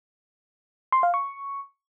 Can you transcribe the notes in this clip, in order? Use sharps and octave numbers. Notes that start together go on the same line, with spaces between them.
C6
F5
C#6